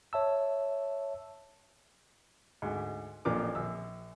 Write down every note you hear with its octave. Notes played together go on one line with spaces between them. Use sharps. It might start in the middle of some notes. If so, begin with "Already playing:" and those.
C#5 E5 A5 E6
D2 G#2
A1 A#2 F3 D4 A#4 D6
A#1 E6